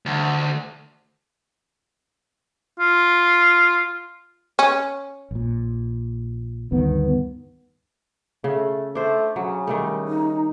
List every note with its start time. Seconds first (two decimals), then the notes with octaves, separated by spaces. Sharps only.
0.06 D2
2.80 F4
4.59 C#4
5.31 A#1 A#2
6.72 D2 G2 D#3 B3
8.44 C#3 A3
8.95 A3 D4 C5
9.36 C#3 F#3
9.67 D#3 G3 A3
10.08 D#4